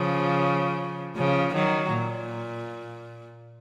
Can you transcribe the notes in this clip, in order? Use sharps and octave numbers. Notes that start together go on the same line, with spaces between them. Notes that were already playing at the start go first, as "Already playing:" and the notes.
Already playing: C#3 F3
C#3 F3
D#3 F#3
A#2